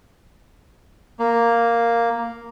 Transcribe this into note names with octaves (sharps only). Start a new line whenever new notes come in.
A#3